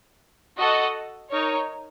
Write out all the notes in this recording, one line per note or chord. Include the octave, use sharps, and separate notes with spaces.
F#4 A4 D#5 F#5
D#4 A#4 C#5